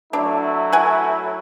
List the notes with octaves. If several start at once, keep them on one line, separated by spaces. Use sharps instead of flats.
F#3 A3 D4 E4
F#5 G#5